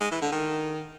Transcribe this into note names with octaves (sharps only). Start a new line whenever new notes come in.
G#3
E3
D3
D#3